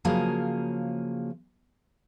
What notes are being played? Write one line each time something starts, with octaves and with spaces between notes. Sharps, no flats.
C#3 F3 F#3 A#3 G#4 F5